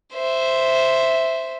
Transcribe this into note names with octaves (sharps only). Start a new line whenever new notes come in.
C5 E5